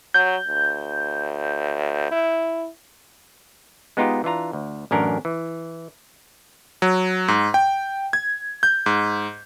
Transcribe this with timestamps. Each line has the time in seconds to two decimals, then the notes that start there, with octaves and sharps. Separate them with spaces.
0.14 F#3 G6
0.47 D2
2.11 E4
3.97 G#3 B3 D#4 F4 G4
4.24 E3 D4 F4 A#5
4.53 D2
4.91 A1 F#2 C#4 D4 A#4
5.25 E3
6.82 F#3
7.28 G#2
7.54 G5
8.13 G#6
8.63 G6
8.86 G#2